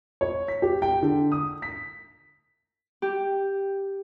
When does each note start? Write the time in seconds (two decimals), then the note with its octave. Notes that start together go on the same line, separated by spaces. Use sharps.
0.21 C#5
0.48 B6
0.62 G4
0.82 G5
1.02 D3
1.32 D#6
1.62 B6
3.02 G4